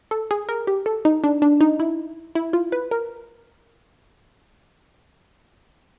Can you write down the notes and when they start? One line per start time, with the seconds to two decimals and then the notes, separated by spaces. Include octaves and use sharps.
0.11 A4
0.31 G#4
0.49 A#4
0.67 G4
0.86 A4
1.05 D#4
1.24 D4
1.42 D4
1.61 D#4
1.79 E4
2.35 E4
2.53 F4
2.72 B4
2.91 A#4